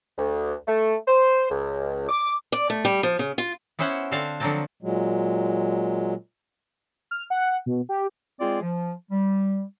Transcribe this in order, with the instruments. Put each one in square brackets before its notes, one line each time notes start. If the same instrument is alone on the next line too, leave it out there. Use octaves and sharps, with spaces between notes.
[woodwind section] D2
A3
C5
C#2
D6
[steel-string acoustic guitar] D5
A3
G3
F3
C#3
F4
[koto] B3 C#4 E4 C5 E5 F#5
D3 C4 D4 C5 F5 A5
D3 F3 F#3 A#3 C4 A5
[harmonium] A#2 F#3 G#3
[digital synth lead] F6
F#5
B2
G4
[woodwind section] G#3 C4 F4 G#4 D5
F3
G3